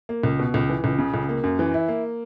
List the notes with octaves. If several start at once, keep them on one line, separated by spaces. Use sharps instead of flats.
A#3
C#2
B2
C#2
E3
C#2
C#3
C#2
A#3
F#2
E3
E4
A#3